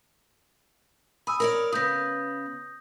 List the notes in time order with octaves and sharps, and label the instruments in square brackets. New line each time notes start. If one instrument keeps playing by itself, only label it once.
[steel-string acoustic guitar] G#5 [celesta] B5 D#6 E6
[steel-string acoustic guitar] A#4 C#5 D5
[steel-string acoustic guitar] C#3 B3 [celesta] D#6 G6 A#6